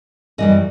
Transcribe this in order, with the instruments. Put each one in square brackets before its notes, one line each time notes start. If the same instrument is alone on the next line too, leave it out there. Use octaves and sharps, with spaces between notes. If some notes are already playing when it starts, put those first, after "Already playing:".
[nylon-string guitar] F#2 E3 G3 D#5